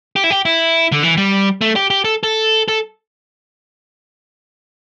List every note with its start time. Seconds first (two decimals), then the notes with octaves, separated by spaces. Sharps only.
0.16 G4
0.24 E4
0.30 G4
0.45 E4
0.92 D3
1.03 E3
1.17 G3
1.61 A3
1.76 G4
1.90 G4
2.05 A4
2.23 A4
2.68 A4